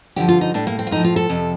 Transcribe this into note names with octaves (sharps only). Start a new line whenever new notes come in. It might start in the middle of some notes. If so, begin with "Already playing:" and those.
G2 D3 F3 G4
F4
D#4
A2 G3 D4
A#3
C4
F4
A2 F3 D#4
F4
A4
F2 C3 F3